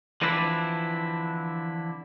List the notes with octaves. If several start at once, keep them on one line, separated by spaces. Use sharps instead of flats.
D3 E3 F3 C4 D4 E4